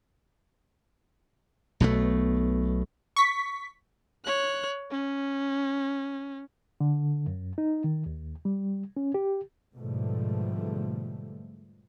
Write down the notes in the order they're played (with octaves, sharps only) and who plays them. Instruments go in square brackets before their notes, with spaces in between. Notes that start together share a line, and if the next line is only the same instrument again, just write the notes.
[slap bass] B1 B2 G3 A3
[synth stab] C#6 B6
[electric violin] C#5 F#6
C#4
[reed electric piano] D3
F#2
D#4
D#3
D#2
G3
C#4
G4
[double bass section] G#2 B2 D3 F3 G3 A3